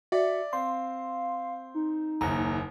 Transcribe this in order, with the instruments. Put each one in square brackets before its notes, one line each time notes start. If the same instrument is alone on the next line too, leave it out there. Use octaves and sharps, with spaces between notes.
[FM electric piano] F#4 [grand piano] D5 [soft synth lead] E5
[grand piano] C4 [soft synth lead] F5 [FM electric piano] C6
[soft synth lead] D#4
[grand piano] F#1 D#2 [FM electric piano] A#5